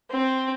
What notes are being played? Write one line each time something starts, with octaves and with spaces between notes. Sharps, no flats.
C4